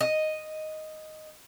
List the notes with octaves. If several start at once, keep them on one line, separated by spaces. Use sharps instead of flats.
D#5